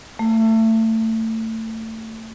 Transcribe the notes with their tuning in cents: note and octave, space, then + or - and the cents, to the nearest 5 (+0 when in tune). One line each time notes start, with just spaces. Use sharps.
A3 +25